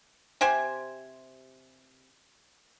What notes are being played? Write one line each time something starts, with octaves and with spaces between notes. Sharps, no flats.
C3 G4 C5 G#5